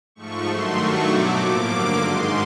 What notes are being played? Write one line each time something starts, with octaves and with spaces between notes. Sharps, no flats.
G#2 F3 A3 C#6
G2 D#3 F#3 A3 C6
G2 D#3 F#3 A3 C#6
B2 F#3 A3 D6
A2 F3 A#3 D6
G2 D3 F#3 A#3 D6
G#2 D#3 G#3 C6